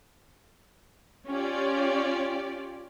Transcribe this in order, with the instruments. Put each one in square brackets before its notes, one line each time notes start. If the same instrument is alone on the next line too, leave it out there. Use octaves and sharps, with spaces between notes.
[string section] C#4 F4 G4 D5